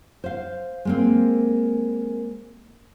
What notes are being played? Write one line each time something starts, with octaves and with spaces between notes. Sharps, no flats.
C5 F5
G#3 A#3 C4